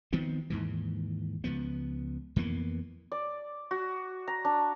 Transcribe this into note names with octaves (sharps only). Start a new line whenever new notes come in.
D#3 F3 B3 C4
D#2 G#2 E3
C#2 F3 B3
F2 E3 A#3 B3
D5
F#4
A#5
D4